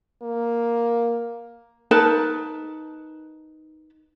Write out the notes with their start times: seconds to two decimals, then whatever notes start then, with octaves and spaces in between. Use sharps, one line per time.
0.22 A#3
1.91 D#4 A#4 B4 A5